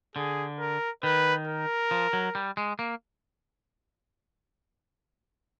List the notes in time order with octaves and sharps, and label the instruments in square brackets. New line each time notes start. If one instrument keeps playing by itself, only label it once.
[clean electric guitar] D3 [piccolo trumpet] G#4
[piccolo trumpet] A#4
[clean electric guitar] D#3 [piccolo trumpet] B4
[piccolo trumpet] A#4
[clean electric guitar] F3
F#3
G3
G#3
A#3